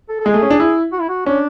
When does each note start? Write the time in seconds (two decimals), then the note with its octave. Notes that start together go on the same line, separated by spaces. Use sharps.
0.09 A4
0.20 A4
0.26 G#3 G#4
0.34 A3
0.42 C#4
0.50 D4
0.60 E4
0.93 F#4
1.01 E4
1.09 F#4
1.26 C#4 D4